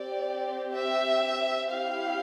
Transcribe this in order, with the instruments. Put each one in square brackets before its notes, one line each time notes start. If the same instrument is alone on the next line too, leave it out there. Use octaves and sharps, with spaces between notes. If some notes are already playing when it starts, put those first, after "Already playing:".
Already playing: [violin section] C4 G4 D5
E5
C4 E4 G4 F5